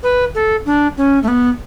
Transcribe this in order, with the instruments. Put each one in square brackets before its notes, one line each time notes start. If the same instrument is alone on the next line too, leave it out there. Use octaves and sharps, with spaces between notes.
[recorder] B4
A4
D4
C#4
A3
B3